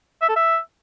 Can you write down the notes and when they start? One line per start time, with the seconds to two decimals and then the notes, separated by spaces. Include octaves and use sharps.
0.22 E5
0.29 A4
0.36 E5